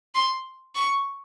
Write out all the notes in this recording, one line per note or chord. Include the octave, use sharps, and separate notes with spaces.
C6
C#6